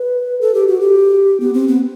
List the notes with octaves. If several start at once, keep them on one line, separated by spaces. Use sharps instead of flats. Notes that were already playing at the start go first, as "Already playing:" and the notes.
Already playing: B4
A4
G4
F#4
G4
B3
C4
B3